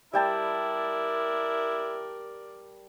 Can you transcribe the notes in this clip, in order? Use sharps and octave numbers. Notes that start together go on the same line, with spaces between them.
G3 E4 A#4 D5 G5 A5